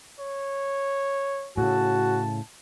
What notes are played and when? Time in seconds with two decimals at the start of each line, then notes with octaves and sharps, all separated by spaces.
0.20 C#5
1.57 A2 C#3 F#4 A5